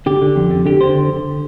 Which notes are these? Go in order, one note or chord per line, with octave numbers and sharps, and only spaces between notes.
D3 G4
D3
F2
D3
D3 G4
D3 C5